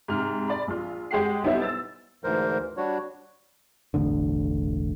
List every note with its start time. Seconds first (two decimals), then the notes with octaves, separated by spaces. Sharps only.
0.08 G#2 C3 F6
0.48 D5 B5
0.68 A#1 F4
1.11 G#3 G4 F#5 C7
1.43 B1 G3 B3 D#4 E4 C5
1.62 E6 A6
2.24 D2 G#2 E3 A#4 C5
2.77 G3 D4 F#4 C#5
3.94 E1 A1 D3